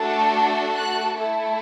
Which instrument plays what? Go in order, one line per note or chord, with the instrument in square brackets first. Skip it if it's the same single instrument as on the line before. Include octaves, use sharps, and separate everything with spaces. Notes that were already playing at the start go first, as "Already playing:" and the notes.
Already playing: [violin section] A3 D4 F#4 A4
F#6
A3 E4 A4